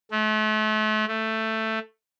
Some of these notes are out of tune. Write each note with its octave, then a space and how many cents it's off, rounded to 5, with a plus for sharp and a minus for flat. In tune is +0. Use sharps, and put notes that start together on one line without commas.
A3 -35
A3 +10